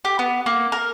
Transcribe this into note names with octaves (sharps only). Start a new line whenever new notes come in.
G4
B3
A#3
A#4